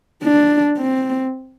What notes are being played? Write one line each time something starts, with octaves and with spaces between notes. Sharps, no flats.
D4
C4